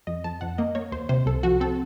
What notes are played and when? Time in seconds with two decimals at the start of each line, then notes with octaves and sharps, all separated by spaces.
0.07 F2 D#5
0.24 F2 A5
0.41 F2 F#5
0.58 A#3 D#5
0.75 A#3 C#5
0.92 D#2 C5
1.09 C3 C5
1.26 C2 A4
1.43 F3 F#4
1.60 C4 A4